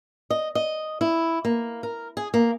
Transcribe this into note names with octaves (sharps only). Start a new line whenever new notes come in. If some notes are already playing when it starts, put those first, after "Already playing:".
D#5
D#5
E4
A#3
A#4
G#4
A#3